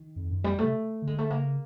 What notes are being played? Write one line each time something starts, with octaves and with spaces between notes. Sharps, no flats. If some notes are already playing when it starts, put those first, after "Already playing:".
Already playing: D#3
F2
F#2
F2 G3
C3 A3
D3
G#3
A3
C#3 A#3